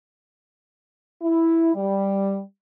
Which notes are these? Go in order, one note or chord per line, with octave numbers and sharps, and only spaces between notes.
E4
G3